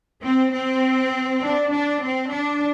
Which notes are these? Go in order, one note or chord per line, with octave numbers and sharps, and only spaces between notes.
C4
C4
D4
D4
C4
D4